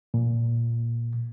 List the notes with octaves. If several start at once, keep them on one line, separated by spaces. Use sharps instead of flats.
A#2